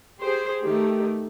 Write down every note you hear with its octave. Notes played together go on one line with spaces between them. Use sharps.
G4 G#4 C5
D#3 A3 G4